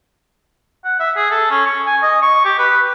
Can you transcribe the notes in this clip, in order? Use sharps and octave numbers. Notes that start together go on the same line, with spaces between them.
F#5
E5
G#4
A4
C#4
C#6
G#5
D#5
C#6
G4
B4